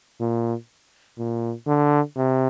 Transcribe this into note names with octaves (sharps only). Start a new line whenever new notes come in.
A#2
A#2
D3
C3